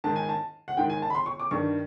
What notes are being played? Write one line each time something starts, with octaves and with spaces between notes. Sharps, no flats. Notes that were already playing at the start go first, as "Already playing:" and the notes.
G#2 D#3 A5
G#5
A5
F#5
G#2 D#3 G5
G#5
A5
B5
C6
C#6
D6
G2 D#3 C#6